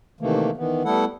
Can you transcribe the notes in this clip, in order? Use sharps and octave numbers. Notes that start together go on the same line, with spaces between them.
C3 D#3 E3 A3 A#3
D#3 E3 B3
G3 A3 B3 E4 A4 F#5